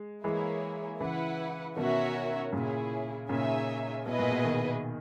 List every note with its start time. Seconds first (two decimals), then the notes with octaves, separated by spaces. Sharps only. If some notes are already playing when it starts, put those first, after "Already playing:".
Already playing: G#3
0.24 E3 G#3 A#3 E4 G#4 C#5
1.00 C#3 E3 E4 B4 F#5
1.76 B2 D#3 C#4 F#4 A#4 C#5 E5
2.53 A#2 C#3 C#4 E4 G#4
3.29 A#2 C#3 D#4 G#4 C#5 E5 G#5
4.06 B2 B3 E4 G#4 B4 D#5
4.19 A#2
4.31 B2
4.44 B2 D#3